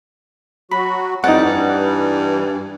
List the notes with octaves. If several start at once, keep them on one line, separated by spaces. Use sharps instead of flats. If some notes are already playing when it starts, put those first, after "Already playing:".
F#3 F#4 B5
F2 E3 G3 D#4 D5 F#5
G2